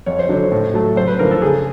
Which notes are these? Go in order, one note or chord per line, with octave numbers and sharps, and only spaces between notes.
F2 C#5
C5
D3 F#3 C#5
A2
F#3 A3
F#2 C5
B4
D3 F3 A3 A#4
A4
C#3 G#4